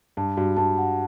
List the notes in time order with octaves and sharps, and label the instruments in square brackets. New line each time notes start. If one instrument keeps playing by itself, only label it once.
[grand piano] G2 [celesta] A5
[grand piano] G2 [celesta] F#4
[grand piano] G2 [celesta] A5
[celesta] F#5